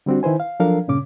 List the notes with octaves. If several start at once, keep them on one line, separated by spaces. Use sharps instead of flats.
D3 G3 C4 D4 F#4
D#3 E4 B4 C5 G#5
F5
F3 F#3 D4 A4 A#4 F5
G2 A#2 C#3 C#4 D6